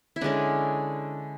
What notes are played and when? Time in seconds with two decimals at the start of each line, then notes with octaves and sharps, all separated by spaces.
0.16 E4
0.21 D3 G#3 C#4 D4